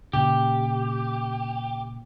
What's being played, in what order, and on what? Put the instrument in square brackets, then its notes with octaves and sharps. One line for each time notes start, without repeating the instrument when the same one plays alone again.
[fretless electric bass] A#2 C#3 [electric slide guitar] G4